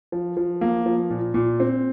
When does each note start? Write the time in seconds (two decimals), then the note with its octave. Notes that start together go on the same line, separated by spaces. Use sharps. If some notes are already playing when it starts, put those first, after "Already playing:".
0.12 F3
0.37 F3
0.61 A#3
0.86 F3
1.10 A#2
1.34 A#2
1.60 C4